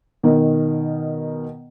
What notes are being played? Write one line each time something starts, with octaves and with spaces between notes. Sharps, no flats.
B2 D#3 A#4